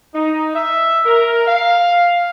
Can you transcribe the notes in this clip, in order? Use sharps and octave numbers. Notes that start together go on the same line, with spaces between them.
D#4
E5
A#4
F5